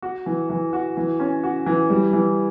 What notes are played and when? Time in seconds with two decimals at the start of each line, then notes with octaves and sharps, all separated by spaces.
0.02 F#4
0.26 E3
0.50 E3
0.73 F#4
0.97 E3
1.20 C#4
1.43 F#4
1.66 E3
1.90 G3
2.13 E3